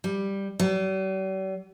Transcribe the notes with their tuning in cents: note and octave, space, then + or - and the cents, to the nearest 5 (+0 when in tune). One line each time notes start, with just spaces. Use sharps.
G3 +5
G3 -45